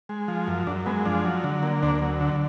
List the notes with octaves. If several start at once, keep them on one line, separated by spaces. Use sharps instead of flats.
G#3
F3
F#2
F#2 D4
G#3 B3
F3 D4
F#3
D3
A#3
D2 D4
F#3
D3